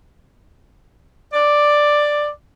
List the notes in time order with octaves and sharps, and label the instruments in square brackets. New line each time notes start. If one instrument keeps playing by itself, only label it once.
[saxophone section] D5